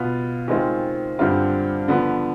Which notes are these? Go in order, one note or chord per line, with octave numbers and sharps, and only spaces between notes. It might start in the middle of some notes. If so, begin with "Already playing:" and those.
Already playing: B2 B3 F4
D#3 G#3 C4 F4
G2 D3 G3 C4 F4
D3 F3 B3